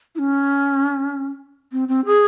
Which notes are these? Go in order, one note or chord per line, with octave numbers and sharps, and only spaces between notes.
E4
C#4
C4
C4
G#4